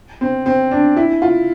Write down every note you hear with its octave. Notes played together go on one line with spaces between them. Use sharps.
C4
C4
D4
E4
F4